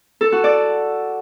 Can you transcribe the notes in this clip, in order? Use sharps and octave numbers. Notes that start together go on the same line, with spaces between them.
A4
F#4
D5